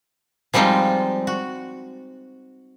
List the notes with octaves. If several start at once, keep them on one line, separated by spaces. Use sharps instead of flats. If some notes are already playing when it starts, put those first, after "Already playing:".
F3 G3 G#3 C4 D#4 F4
F#4